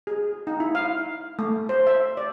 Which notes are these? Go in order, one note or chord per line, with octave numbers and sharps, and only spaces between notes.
G#4
D#4
E4
F5
A3
C5
E5
D5